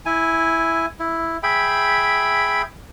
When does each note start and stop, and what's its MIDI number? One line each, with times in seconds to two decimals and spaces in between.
0.06 0.86 64
0.06 0.86 80
1.00 1.37 64
1.43 2.62 68
1.43 2.62 76
1.43 2.62 79
1.43 2.62 83